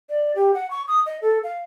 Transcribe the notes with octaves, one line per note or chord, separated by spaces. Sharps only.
D5
G4
F#5
C#6
D#6
D#5
A4
F5